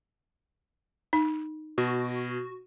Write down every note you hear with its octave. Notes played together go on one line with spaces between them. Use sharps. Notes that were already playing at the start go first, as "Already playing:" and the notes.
D#4
B2 F#4